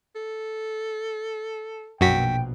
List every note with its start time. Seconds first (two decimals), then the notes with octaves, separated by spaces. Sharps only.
0.15 A4
2.01 A#1 F#2 B2 F#4 G5 B6